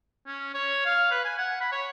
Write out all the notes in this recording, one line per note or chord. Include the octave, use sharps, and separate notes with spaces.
C#4
C#5
F5
B4
G#5
F#5
B5
C#5